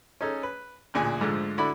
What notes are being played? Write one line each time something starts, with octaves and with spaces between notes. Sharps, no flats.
C#4 D#4 G#4 A4
B4
A1 D2 A#2 G#4 G#5
G#2 D3 F3 G#3 A3
D3 E4 F#4 D5 B5